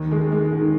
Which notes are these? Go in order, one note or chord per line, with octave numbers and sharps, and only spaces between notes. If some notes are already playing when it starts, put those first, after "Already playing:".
Already playing: D#2 D#3
G#3
G#3
D#2 D#3